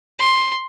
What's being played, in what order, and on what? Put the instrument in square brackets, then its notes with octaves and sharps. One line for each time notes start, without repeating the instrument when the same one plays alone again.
[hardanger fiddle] C6